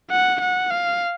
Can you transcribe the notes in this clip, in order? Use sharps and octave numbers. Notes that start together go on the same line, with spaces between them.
F#5
F#5
F5